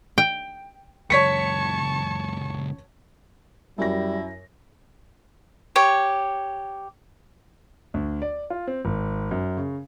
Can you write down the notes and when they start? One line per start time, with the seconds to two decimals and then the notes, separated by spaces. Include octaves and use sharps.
0.18 G5
1.10 C#2 F#2 C#5 A5 C#6 B6 C#7
3.78 F#2 G3 E4 A#6
5.76 G4 C#5
7.94 D2
8.22 D5
8.50 F4
8.67 C4
8.85 G#1
9.31 F#2
9.57 C#3